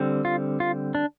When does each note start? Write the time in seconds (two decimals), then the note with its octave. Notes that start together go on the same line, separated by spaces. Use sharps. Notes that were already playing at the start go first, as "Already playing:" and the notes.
Already playing: D3 G3 C4
0.25 F4
0.60 F4
0.95 D4